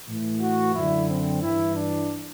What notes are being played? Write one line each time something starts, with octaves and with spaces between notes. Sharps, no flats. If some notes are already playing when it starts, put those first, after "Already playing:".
A2 E3
F#4
F#2 D3 E4
C4
G2 E3 E4
D4